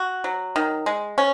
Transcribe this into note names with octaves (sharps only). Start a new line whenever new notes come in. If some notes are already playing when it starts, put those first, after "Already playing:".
Already playing: F#4
F#3
D#3
G#3
C#4